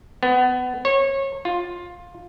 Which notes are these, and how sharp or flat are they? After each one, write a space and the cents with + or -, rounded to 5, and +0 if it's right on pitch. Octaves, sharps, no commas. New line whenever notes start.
B3 +25
C#5 -25
F4 +10